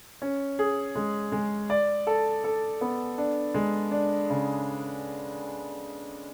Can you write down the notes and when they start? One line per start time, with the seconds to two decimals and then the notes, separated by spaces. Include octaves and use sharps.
0.22 C#4
0.59 G#4
0.95 G#3
1.32 G#3
1.70 D5
2.07 A4
2.44 A4
2.81 B3
3.18 D4
3.54 G#3
3.91 D4
4.30 C#3